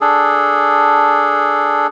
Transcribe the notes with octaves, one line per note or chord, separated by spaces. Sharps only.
D4 G#4 A4